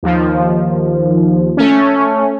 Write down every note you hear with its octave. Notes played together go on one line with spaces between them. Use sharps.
D#2 F3
A3 C#4